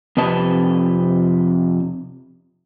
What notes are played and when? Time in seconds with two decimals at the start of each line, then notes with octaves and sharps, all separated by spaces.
0.17 F2 C3 B4 D#5 A5